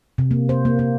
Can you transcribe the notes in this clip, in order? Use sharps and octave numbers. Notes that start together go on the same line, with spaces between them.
C3
A#3
C5
A#3
A#3